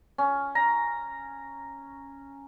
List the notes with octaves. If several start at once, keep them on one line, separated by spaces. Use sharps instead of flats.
C#4
A#5